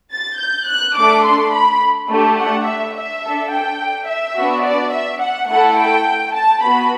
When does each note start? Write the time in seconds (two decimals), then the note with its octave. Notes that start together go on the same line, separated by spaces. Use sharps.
0.13 A6
0.40 G6
0.68 F#6
0.97 A3 D4 A4 D6
1.25 C6
1.54 B5
2.10 A3 D4 G4
2.39 F#5
2.67 E5
2.95 E5
3.24 D4 A4
3.52 G5
4.08 E5
4.36 B3 D4 F#4
4.65 D5
4.94 E5
5.22 F#5
5.50 A3 E4 A4 F#5
5.79 G5
6.35 A5
6.63 B3 F#4 B5